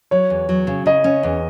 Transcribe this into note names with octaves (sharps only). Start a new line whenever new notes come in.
F#3 C#5
E2
F#3
C#3
C#3 D#5
C#4
E2